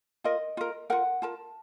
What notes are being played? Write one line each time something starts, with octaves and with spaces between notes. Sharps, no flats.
F4 A#4 D#5
F4 A#4
F4 A#4 F#5
F4 A#4 A5